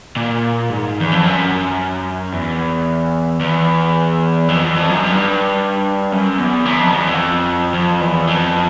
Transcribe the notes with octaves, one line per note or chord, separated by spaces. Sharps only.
A#2
G#2
E2
F2
F#2
E2
E2
F2
E2
F2
F#2
G2
F#2
E2
F#2
F2
E2
F2
F2
E2
F2